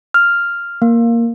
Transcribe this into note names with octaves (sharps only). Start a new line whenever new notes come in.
F6
A#3